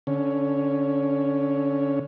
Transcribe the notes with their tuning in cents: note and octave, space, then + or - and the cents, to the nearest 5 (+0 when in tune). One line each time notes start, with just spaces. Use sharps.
D3 -20 C#4 +0